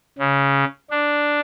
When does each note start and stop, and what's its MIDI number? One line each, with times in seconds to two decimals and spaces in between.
0.19 0.64 49
0.90 1.40 62